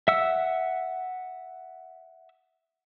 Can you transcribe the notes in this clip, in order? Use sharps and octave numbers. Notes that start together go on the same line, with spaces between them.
E5 F#5 E6